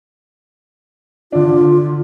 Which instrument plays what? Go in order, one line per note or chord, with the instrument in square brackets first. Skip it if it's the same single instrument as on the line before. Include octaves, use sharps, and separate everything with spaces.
[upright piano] D3 D4 [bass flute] F4